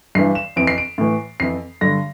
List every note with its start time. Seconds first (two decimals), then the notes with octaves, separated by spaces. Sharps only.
0.15 G2 E3 C7
0.35 E7
0.56 F2 E3 D7
0.67 C7
0.78 D7
0.98 A2 E3
1.40 F2 E3 C7
1.81 G2 D3 A#6